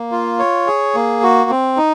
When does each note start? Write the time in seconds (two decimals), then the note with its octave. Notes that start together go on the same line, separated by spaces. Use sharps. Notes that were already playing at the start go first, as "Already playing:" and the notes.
Already playing: A#3
0.12 F4
0.39 C#5
0.67 G#4
0.95 A#3
1.23 F#4
1.50 C4
1.77 D#4